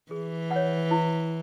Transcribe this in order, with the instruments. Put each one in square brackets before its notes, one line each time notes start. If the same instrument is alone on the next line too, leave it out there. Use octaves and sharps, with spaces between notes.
[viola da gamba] E3 [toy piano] G#4
[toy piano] F#5
C#5
E4